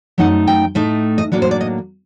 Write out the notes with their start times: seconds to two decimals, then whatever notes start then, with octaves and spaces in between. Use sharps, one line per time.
0.18 F#2 F#3 A3 D#4 F#5
0.47 G5
0.75 A2 A3 D#4
1.18 D#5
1.32 A2 F#3 A#3 D4 D5
1.42 C5
1.51 D5
1.61 D#5